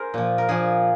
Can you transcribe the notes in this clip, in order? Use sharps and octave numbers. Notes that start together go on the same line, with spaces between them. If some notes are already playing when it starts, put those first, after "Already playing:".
Already playing: G#4 A#4 C5
A#2 F3
A#4
A#2 F3 G#4